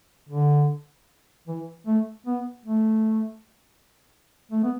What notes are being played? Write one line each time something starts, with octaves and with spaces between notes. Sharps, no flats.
D3
E3
A3
B3
A3
A3
B3